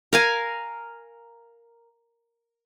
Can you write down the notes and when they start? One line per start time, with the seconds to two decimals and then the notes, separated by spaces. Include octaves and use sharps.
0.13 A#4 F5 G#5